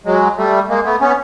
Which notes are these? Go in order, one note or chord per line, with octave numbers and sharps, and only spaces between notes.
F#3 G#3
G3 A3
G#3 A#3
A3 B3
B3 C#4